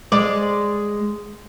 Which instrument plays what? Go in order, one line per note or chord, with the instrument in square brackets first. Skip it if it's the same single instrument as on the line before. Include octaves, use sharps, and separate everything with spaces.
[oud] G#3 D5